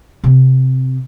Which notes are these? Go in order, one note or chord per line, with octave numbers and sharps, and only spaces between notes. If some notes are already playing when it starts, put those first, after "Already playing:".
C3 C4